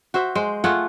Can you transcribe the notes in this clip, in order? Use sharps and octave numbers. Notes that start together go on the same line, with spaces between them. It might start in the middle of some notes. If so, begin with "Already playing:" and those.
F#4 C5 E5
G#3 C5
A3 F4 G#4 F#5